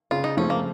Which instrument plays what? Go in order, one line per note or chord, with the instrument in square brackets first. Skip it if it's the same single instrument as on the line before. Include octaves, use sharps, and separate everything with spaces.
[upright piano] C#3 [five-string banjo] F4
[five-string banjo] D#4
[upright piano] F3 A3 C4 F4 [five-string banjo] C#4
[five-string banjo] A#3